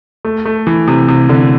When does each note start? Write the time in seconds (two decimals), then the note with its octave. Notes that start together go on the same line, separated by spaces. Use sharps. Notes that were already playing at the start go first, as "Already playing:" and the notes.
0.25 A3
0.46 A3
0.67 E3
0.88 C3
1.08 C3
1.29 D3